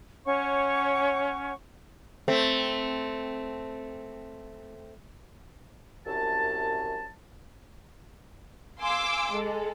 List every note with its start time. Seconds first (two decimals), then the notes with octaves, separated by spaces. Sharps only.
0.26 C#4 C#5 F#5 C#6
2.28 A3 C4
6.06 C2 F#2 A5
8.79 F5 G#5 C6 D6 E6
9.31 G#3 A4